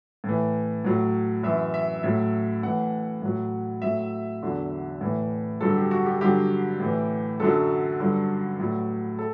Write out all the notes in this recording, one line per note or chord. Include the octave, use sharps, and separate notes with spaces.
A2 E3
A2 F#3
F#2 E3 E5
E5
A2 F#3 E5
A2 E3 F#5
A2 F#3
A2 F#3 E5
E2 D3 F#3
A2 E3
G2 D3 F#3 A4
G4
F#4
G4
G2 D3 F#3 G4
A2 E3
F#2 D3 F#3 A4
G2 D3 F#3
A2 F#3
A4